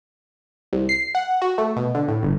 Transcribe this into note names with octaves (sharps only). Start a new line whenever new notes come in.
C2
C7
F#5
F#4
A3
B2
D3
A2
G1